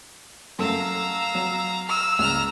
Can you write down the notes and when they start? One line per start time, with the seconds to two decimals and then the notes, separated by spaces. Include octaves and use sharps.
0.59 F#2 A3 F5 A#5 E6
1.35 F#3
1.89 E6 F6
2.19 C#2 A#5 F6